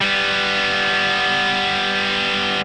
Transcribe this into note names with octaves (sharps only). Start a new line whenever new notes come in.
G3 B3